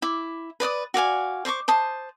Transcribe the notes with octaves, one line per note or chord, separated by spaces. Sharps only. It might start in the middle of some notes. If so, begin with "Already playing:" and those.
E4 D6
B4 D5 D6 D#6
F#4 D5 F5 G#5
C5 D5 C#6 D6
C5 A5 D#6